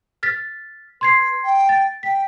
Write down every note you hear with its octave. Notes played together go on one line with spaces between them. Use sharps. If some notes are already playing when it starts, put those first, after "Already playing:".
F6 A6 B6
B4 C6 G#6 C7
G5
A6
G5 B6